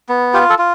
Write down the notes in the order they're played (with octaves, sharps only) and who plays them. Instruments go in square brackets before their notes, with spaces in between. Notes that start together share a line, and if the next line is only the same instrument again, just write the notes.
[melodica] B3
F4 G4
A4
F4